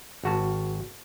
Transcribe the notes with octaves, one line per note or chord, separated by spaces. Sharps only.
G#1 F#4 A5